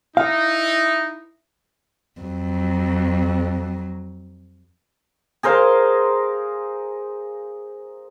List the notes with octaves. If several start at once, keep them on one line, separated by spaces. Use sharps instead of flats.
D#4 E4 F5
F2 F#3
G#4 A#4 C5 F5